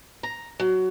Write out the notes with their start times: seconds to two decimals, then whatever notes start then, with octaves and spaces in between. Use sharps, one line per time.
0.23 A#5
0.60 F#3